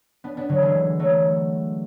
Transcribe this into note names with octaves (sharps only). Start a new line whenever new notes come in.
B3 D4
B3 D4
D3 F#3
E3 G#3
F#3 A3